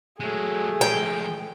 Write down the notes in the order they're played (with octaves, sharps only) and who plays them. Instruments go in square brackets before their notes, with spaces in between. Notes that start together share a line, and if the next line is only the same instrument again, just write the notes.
[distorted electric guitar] F#3 G#3 [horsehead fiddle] A3 [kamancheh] G#4
[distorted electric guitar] F3 G#3 [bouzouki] G5